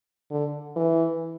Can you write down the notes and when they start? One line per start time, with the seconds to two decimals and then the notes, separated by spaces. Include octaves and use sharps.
0.31 D3
0.76 E3